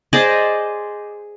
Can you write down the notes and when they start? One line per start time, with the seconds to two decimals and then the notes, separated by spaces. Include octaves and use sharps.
0.13 G#4 C5 D5 D#5